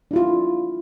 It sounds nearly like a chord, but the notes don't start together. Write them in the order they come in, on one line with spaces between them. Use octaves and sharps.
D4 E4 F4